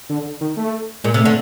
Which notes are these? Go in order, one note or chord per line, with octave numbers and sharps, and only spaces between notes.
D3
D#3
A3
A#2 G#3
C3
A3
D3